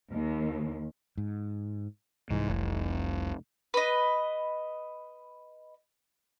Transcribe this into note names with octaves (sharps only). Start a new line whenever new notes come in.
D#2
G#2
C2 G#2 E3
F1
B4 D#5